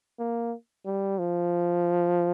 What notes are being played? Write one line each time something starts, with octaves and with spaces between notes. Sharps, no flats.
A#3
G3
F3